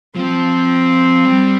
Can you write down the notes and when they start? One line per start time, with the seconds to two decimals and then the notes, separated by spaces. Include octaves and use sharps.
0.16 F3 C4
1.25 G3